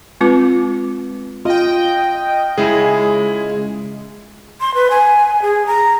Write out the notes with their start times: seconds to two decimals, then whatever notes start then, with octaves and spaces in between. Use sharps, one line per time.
0.21 G#3 C4 F4 B4 D6
1.45 F4 D#5 G5
2.58 C#3 G#3 E4 G#4
4.61 C6
4.74 B4
4.90 G#5
5.42 G#4
5.67 A#5